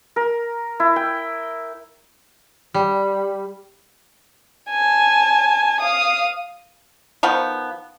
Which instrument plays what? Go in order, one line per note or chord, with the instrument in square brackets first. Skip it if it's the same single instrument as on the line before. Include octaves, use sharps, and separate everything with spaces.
[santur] A#4
E4
G5
[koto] G3
[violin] G#5 A5
F5 D#6
[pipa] D#3 F3 B3